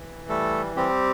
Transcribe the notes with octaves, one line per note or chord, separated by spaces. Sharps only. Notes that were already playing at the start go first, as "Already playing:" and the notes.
Already playing: E3
G3 A3 A4
G3 C4 G4